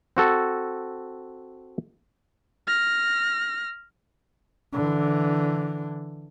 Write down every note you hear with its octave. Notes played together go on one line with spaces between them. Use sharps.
C4 F#4 A4
F6 A#6
D3 E3